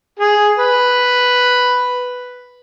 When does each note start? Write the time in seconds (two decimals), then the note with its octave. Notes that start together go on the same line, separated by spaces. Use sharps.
0.19 G#4
0.58 B4